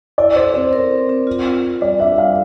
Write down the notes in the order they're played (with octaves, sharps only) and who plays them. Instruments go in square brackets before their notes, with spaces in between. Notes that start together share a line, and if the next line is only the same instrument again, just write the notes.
[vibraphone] E4 [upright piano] D5
[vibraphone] A4 [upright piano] C5
[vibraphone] C4 [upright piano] C5
[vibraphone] A#4
C4
C4
F4
F4
F4
[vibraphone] G3 [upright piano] D5
[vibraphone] D4 [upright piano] E5
[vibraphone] G3 [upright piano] F5